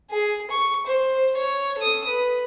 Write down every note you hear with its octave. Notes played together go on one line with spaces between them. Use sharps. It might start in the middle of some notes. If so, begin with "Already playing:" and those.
G#4
C#6
C5
C#5
A4 D#6
B4